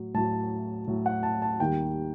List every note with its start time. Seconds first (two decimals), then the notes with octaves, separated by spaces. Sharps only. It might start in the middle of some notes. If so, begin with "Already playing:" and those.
Already playing: A2 F#3
0.14 A2 F#3 A5
0.87 A2 F#3
1.06 F#5
1.23 A5
1.42 A5
1.59 D#2 D#3 G3 G5